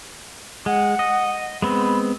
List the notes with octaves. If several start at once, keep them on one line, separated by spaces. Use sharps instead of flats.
G#3 F#5
D#5
G#3 B3 C4 B5